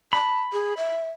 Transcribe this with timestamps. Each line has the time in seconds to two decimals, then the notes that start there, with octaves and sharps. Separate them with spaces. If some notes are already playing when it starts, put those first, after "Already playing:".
0.13 A5 B5
0.53 G#4
0.77 E5